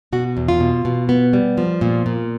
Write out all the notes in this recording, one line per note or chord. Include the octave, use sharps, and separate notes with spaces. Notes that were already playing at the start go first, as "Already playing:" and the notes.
B2 F#4
E2
F4
B2
B2
B3
G3
F3
A#2
A#2